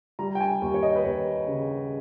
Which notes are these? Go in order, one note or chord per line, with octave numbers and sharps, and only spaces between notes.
G3 A#5
G5
G#5
D#2
C#5
D#5
B4
D#2 C#5
C#3